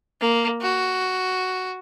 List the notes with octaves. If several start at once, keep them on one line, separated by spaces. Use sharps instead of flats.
A#3
F#4